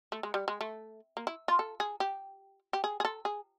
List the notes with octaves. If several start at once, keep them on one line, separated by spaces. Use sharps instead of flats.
A3
G#3
G3
G#3
A3
A#3
E4
F4
A4
G#4
G4
G4
G#4
G#4
A4
G#4